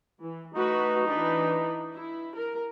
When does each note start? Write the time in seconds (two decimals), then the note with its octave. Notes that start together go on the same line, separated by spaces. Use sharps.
0.21 E3
0.54 A3 D#4 F#4 B4
1.07 E3 D4 B4
1.95 E4
2.36 A#4